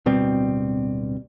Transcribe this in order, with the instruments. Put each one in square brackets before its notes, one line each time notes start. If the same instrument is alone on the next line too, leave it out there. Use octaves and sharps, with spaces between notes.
[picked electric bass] D1 B2 G3 C4